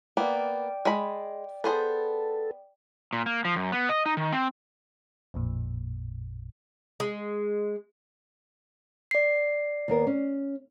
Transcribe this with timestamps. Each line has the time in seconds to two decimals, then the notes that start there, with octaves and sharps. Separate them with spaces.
0.17 A#3 B3 D5 G5
0.85 G#3 B5
1.64 B3 G#4 A4 C5
3.13 A#2
3.26 A#3
3.45 F3
3.56 F#2
3.72 B3
3.89 D#5
4.06 D#4
4.17 D#3
4.32 C4
5.34 A1 F2 A#2
7.00 G#3
9.11 D5 C7
9.88 D#2 B3 A#4
10.07 C#4